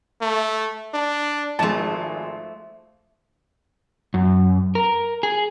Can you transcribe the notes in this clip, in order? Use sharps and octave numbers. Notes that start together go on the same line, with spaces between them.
A3
D4
G#1 F3 G#3 A3 A5
F#2
A#4
G#4